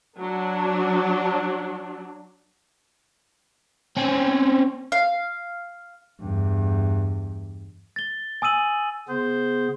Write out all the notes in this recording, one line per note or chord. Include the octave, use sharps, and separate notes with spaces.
F#3 D4
C4 C#4
F5
E2 G2
A6 G7
G#5 D#6 E6 D#7 F#7
C#3 B3 G#4 C5